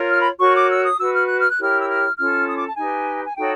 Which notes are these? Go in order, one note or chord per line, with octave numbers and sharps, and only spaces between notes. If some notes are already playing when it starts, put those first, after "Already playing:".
Already playing: F4 A#4 C#5
F6
B5
F#4 A#4 C#5 C#6
D6
E6
D#6
F#4 B4 E6
F6
F#6
F6
F#6
E4 G4 A#4 C#5 F6
E6
F6
C#4 F4 A4 F6
D#6
D6
A5
D#4 G4 B4 G#5
G#5
D#4 F#4 A4 C#5 G5